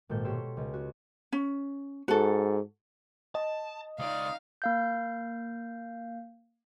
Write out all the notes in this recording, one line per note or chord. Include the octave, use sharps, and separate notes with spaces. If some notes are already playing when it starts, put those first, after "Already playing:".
G#1 A#2 A4 G6
B2 G4 C#5 C6 E6 E7
C#2
C#4 F#4
C#4
G#2 F#4 A4
D#5 A5
C#2 D#4 D5 F5 D#6
A#3 F5 G6